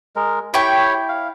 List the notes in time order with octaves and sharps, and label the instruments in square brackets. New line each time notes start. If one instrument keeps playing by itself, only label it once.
[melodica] G#3 A#4
[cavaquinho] E4 G5 C#6 [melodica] G4 C#5 B5
[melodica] F5